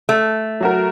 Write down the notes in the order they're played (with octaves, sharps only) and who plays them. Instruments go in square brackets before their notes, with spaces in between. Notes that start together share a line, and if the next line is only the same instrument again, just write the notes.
[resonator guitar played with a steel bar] A3
[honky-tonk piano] F#3 F#4 A#4